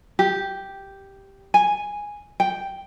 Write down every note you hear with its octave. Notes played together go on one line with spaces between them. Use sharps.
G4
G#5
G5